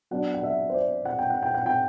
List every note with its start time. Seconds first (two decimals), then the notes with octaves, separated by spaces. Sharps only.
0.11 F#3 B3 D4 F#5
0.34 F#5
0.43 E5
0.70 C5
0.74 D5
1.05 F#5
1.19 G5
1.30 F#5
1.43 G5
1.54 F#5
1.66 G5